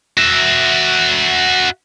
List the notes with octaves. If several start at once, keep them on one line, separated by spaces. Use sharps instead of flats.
F#4 E5